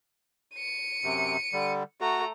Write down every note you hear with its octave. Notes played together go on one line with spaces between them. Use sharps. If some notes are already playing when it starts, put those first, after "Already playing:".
C#7 D#7
F#2 C3
D3 G3
A3 F#4 A#5